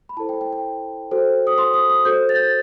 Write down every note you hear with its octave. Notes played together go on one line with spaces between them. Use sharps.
B5
E4 A4 C5 A5
G5
G5
G5
F#4 A4 C5
D#6
C6
D#6
D#6
F#4 A4 C5 G6
A6
G6
A6